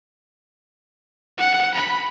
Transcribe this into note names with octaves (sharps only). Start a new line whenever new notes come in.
F#5
B5